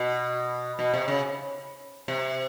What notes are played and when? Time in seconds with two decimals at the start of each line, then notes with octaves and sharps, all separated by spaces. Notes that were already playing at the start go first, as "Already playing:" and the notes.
Already playing: B2
0.79 B2
0.93 C3
1.08 C#3
2.08 C3